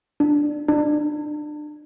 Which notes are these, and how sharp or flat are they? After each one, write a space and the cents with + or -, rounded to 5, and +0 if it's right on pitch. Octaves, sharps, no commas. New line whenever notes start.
D4 +10
D4 +30